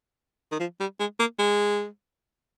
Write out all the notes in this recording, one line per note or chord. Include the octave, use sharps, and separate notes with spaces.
D#3
F3
G3
G#3
A#3
G#3